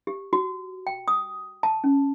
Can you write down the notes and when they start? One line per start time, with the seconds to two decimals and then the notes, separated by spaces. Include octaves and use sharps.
0.07 G4
0.33 F#4
0.87 G5
1.08 D#6
1.63 A5
1.84 C#4